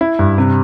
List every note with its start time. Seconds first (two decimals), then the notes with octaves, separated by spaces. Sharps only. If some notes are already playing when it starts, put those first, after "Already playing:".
0.01 E4
0.19 G2
0.38 C3